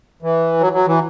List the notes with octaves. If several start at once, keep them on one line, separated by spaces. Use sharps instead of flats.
E3
F#3
F#3
E3